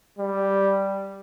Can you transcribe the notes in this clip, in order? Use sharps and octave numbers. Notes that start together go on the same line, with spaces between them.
G3